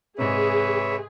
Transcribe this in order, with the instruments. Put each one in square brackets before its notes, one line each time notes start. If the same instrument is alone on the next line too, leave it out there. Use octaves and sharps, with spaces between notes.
[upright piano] G#2 C3 [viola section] G#4 [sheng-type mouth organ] B4 C#5 E5